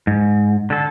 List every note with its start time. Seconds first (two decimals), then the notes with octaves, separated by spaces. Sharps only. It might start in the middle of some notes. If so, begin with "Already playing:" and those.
0.07 G#2
0.70 D3 A4